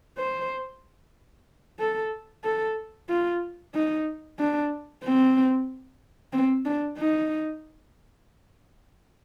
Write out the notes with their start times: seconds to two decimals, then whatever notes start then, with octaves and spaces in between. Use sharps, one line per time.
0.18 C5
1.80 A4
2.44 A4
3.09 F4
3.74 D#4
4.39 D4
5.03 C4
6.33 C4
6.65 D4
6.98 D#4